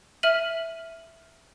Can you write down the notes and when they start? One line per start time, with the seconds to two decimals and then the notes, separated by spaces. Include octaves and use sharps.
0.23 E5 F6 D#7 F#7